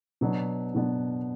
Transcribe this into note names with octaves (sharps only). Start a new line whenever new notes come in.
B2 F#3 B3 D4
B2 F#3 B3 D4